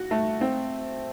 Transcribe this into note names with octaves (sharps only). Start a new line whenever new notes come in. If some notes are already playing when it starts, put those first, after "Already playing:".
Already playing: F#4
A3
C4